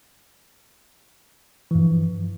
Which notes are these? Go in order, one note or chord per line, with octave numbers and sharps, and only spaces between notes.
G2 E3 F3